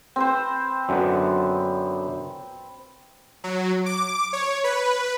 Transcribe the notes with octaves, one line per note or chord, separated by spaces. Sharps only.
C4 B4 C5
F#2 D3 B3
F#3
D6
C#5
B4